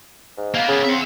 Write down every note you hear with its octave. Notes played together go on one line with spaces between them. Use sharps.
G#2
A#3 B3 F5
C#3
C4 E5 F#5